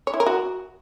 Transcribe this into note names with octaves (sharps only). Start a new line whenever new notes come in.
C#5
E4
A#4
F#4